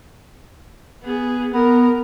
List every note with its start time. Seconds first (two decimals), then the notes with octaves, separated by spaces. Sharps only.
1.03 B3 G#4
1.53 B3 A#4